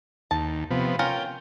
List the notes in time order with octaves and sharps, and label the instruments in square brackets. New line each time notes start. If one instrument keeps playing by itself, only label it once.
[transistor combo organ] D#2 [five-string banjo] A5
[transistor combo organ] C3 F3 B3
[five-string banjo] C#4 F4 A#4 [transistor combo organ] G5